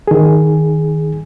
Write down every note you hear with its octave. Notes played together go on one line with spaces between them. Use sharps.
D#3 G#4